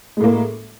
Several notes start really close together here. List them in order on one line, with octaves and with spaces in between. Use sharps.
G#3 A2 A#3